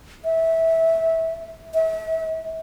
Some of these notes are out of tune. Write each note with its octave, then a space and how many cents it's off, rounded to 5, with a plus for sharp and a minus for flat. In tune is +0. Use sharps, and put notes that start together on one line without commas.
E5 -15
E5 -35